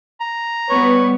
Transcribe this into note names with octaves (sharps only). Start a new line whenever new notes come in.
A#5
G3 B3 B4 C#5 C#6